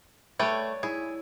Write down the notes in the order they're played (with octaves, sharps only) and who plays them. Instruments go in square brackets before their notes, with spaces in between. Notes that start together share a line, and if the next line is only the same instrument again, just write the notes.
[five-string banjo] A3 B4 G5 [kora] C#5 D5
[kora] E4 [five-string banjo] G#4